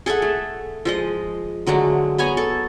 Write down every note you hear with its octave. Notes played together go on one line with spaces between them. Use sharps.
G#4 A4 E5 F#5
A3
F3 G#3 D#5
D3 F#3 G#3 A3
B3 C#5 G#5 A#5
A4